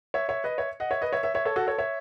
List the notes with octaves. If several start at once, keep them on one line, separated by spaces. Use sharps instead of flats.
C#5 E5
C#5 E5
B4 D#5
C#5 E5
D#5 F#5
C#5 E5
B4 D#5
C#5 E5
C#5 E5
C#5 E5
A4 C#5
F#4 A4
A4 C#5
C#5 E5